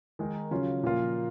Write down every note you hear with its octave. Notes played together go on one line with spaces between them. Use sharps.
D#3 G#3 D#4 A#4
C#3 F#3 C#4 F4
A#2 F3 A#3 F4